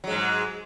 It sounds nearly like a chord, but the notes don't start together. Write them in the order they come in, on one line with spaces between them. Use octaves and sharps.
F#3 G#3 G#2